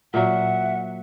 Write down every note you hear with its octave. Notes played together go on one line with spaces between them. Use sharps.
A#2 F#3 E5 F#5